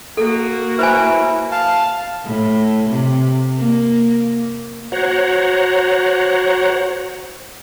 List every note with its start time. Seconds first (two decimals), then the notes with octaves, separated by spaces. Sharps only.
0.17 A#3 F#4 A4
0.79 E4 B4 C5 G#5
1.52 F5 A5
2.25 A2
2.90 C3
3.58 A#3
4.92 F#4 C5 C#5 F#5 A#5